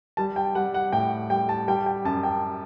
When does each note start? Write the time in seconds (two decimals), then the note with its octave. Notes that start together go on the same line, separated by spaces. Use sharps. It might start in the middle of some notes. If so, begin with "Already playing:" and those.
0.17 G3 A5
0.36 G5
0.55 G3 F#5
0.74 F#5
0.93 A2 G5
1.30 G3 G5
1.49 A5
1.68 G3 G5
1.86 G5
2.05 F#2 A5
2.23 G5